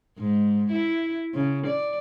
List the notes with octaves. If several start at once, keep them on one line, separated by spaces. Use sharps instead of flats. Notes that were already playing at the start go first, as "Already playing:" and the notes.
G#2
E4
C#3
D5